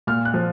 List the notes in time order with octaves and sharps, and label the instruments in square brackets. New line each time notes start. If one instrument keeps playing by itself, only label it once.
[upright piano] A#2 F6
F#6
F3